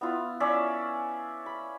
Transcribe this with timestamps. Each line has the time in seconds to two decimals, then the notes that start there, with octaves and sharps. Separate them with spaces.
0.01 B3 E4 F4
0.40 C#4 D5 E5 F5
1.46 B5